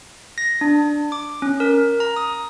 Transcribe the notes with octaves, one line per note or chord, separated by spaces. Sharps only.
A#6
D4
D6
C#4
A#4
A#5
D#6